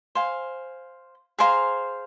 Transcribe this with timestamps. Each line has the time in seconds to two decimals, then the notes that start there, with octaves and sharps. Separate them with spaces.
0.15 C5 F5 G#5
1.39 G#4 C5 F5 A#5